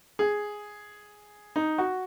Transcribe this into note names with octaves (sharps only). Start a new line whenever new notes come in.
G#4
D#4
F#4